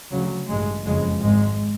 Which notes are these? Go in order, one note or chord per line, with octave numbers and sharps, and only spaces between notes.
D2 C#3 F#3
A1 G2 G#3
F#1 F2 C#3 G#3
G#1 G#2 G#3